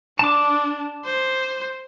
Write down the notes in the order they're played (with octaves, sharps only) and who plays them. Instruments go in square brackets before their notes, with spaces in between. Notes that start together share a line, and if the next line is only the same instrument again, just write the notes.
[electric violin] D4 [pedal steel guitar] A5 D6
[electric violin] C5